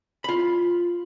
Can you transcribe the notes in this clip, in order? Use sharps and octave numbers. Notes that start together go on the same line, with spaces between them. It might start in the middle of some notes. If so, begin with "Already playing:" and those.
F4 B5